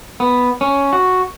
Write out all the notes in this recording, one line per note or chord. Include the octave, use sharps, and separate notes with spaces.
B3
C#4
F#4